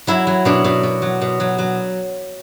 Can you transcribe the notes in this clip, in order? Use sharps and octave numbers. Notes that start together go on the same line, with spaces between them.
F#3 E4
F#3
B2 D4
B2
B2
F#3
B2
F#3
F#3